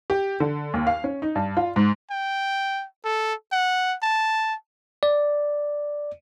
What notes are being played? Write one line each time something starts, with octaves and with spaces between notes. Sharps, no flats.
G4
D3
D#2
F5
C#4
D#4
G2
F4
G#2
G5
A4
F#5
A5
D5